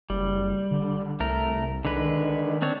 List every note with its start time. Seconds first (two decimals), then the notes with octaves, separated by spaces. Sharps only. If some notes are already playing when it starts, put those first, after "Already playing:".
0.10 F#1 G3
0.71 D3
1.20 C2 A3 A#4
1.85 D3 D#3 G#3 B4
2.62 C4 D4 C#5